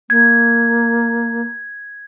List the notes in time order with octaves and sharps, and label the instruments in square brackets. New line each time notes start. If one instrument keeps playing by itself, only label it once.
[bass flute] A#3 [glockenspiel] G#6